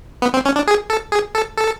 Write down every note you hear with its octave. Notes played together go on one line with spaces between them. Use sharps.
B3
C4
C#4
D4
G#4
A4
G#4
A4
A4